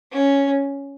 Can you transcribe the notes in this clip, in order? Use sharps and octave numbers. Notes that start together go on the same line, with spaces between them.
C#4